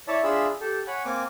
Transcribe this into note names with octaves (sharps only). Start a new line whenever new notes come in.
E4 C#5 D5 E5 A5
D4 F4 G#4 E5 B5 E6
G4 A4
C#5 F#5 G#5 B5
A#3 C4 G#5 D6